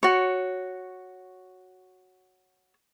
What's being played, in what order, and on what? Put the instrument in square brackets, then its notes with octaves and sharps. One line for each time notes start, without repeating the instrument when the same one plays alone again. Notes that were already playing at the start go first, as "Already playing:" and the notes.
[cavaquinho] F#4 C#5